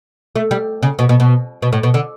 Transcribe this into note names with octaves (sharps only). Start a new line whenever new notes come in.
A3
G3
C#3
B2
B2
B2
B2
A2
B2
D3